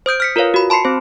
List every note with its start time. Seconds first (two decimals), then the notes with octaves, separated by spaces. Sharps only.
0.06 C5 D#6 G6 D7
0.20 F6 B6 C#7
0.36 F4 A#4 B4 C#5 F5
0.54 F#4 B5
0.70 A5 B5 C6 C7 C#7
0.85 C4 C5